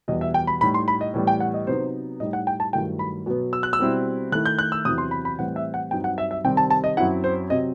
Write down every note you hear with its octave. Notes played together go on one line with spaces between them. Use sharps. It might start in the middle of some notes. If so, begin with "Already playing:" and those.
E2 B2 G3 D#5
E5
G5
B5
A2 G3 D#4 B5
C6
B5
D#5
A2 E3 G3 B3
G5
F#5
D#5
C3 F#3 B3 D#4 C5
A2 G3 D#4 D#5
F#5
G5
A5
G2 D#3 F#3 A3 E4 G5
B5
B2 F#3 B3
E6
F#6
E6
B2 G3 C4 E4
D#3 A3 E4 F#6
G6
F#6
E6
E2 C3 F#3 C4 E4 D#6
C6
B5
B5
A2 E3 G3 C4 F#5
E5
F#5
G2 F#3 C4 D#4 G5
F#5
E5
E5
C3 D#3 G3 C4 G5
A5
A5
D#5
F#2 F#3 C4 E4 F#5
C5
C3 F#3 C4 D#5